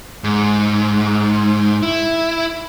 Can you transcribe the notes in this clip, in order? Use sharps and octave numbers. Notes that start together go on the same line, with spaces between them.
G#2
E4